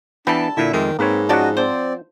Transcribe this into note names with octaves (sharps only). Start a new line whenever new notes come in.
E3 G3 B3 D4 A4 A5
A#2 D3 E4 E5
F2 D#3 G#3
G#2 A#3 C4 B4 C#5
F3 F#3 C#4 F#4 D5 D#5 F#5 A5
C4 C5 D5